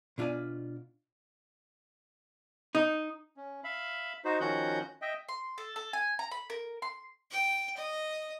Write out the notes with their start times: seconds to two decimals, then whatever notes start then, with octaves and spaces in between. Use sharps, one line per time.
0.18 B2 D4 F4 E5 G#5
2.75 D#4
3.37 C#4
3.64 E5 F5 B5
4.25 D#4 F#4 C5
4.40 D#3 F3 C#4 F#4 F#5 G6
5.02 D#5 E5 G5
5.28 C6
5.58 A4
5.76 A4
5.93 G#5
6.19 A#5
6.31 B5
6.50 A#4
6.82 C6
7.31 G5
7.77 D#5